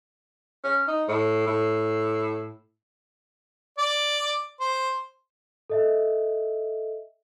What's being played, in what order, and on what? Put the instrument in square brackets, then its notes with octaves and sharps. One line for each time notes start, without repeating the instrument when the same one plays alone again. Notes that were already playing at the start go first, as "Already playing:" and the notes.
[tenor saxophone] C#4
D#4
A2
A2
[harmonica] D5
C5
[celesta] A4 D#5 E5